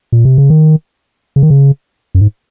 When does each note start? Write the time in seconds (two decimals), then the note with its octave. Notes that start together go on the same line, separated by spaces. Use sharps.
0.12 A#2
0.25 C3
0.38 C#3
0.50 D#3
1.36 C#3
1.43 D#3
1.50 C#3
2.15 F#2
2.21 G#2